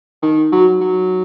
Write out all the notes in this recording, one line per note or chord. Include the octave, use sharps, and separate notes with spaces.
D#3 D#4
F#3 F#4
F#3